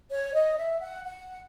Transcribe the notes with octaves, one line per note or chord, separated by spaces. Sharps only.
C#5
D#5
E5
F#5
F#5